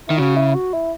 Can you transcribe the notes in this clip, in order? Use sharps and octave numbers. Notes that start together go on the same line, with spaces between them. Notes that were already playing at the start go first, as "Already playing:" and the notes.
D#3 E4
C#3 F#4
E4
F#4
E4